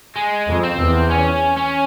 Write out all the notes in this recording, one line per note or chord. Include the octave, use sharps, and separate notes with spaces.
G#3
F2
C4
E2
C#4
C#4